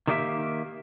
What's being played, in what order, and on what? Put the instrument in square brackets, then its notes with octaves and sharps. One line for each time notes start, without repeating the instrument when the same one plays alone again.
[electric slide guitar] D#3 G3 A#3 D#4 G4 E5